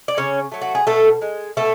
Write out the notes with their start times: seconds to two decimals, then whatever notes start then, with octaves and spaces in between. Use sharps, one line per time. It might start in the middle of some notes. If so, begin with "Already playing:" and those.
0.08 D5
0.17 C#3 C#4 C#5
0.52 F#3 A3
0.62 F#4
0.75 G#4
0.87 B2 A3 A4
1.22 G#3
1.57 B2 A3 A4